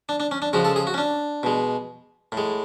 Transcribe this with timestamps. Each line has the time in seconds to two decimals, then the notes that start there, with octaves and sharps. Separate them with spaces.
0.09 D4
0.20 D4
0.31 C#4
0.42 D4
0.53 C#3 F3 G#3 F#4
0.65 A4
0.76 G#4
0.87 F#4
0.94 C#4
0.98 D4
1.43 B2 G#3
2.32 A2
2.37 G#3